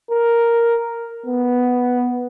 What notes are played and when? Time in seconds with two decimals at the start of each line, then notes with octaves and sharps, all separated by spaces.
0.11 A#4
1.26 B3